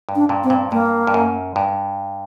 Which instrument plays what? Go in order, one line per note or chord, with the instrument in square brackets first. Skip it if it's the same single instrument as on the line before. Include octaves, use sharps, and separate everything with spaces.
[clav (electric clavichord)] G2
[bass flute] D4
[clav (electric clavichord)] G2 A#2
[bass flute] C4
[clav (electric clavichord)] G2 A#2
[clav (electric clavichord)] G2 [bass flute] A#3
[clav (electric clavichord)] G2
F#2
G2